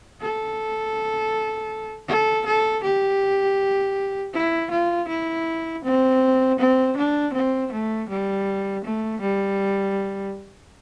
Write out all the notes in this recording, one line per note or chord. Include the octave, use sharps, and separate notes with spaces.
A4
A4
A4
G4
E4
F4
E4
C4
C4
D4
C4
A3
G3
A3
G3